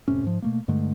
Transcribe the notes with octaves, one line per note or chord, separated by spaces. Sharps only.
F1 A2 C3 C#4
G#2 F3
B2 A3 A#3
G2 D3 G#3 A3